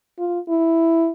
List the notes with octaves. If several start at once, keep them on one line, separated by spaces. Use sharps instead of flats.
F4
E4